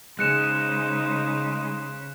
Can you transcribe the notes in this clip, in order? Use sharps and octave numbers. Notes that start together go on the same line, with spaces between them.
C#3 G#3 D#4 C5 F#6 C#7 E7